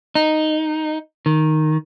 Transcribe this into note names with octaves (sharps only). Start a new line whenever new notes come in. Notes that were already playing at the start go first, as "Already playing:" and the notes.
D#4
D#3